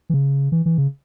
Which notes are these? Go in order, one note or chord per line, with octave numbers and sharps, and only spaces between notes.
E3
C#3
E3
E3
C#3